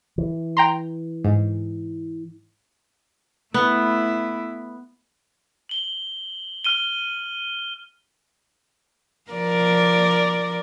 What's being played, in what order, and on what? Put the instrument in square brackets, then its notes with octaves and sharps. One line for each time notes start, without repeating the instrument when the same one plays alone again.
[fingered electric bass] E3
[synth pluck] G5 A#5 C6
G#2
[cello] A3 E4 [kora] B3
[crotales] F#7 G7
F6 D#7 G7
[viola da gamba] F3 A#4 D5